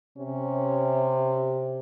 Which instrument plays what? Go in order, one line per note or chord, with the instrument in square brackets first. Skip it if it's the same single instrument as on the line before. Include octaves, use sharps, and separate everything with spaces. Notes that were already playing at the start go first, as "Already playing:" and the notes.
[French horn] C3 [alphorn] C#4